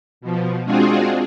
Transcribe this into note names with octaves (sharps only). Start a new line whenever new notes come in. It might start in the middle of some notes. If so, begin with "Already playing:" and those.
B2 F3
G#3 C4 D4 F4 F#4 G#4